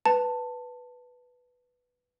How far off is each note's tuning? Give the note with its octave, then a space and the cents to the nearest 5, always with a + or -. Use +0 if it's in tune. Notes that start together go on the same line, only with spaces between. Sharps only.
B4 +0 A5 +10